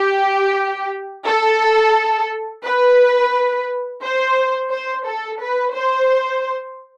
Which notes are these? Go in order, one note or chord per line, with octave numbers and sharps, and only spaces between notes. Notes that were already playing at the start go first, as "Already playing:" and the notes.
Already playing: G4
A4
B4
C5
C5
A4
B4
C5